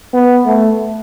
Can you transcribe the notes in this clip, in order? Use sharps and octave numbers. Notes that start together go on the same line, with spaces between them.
B3
A3